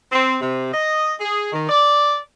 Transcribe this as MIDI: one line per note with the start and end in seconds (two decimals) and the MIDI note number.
0.11 0.35 60
0.40 0.71 48
0.72 1.12 75
1.20 1.51 68
1.52 1.67 51
1.68 2.17 74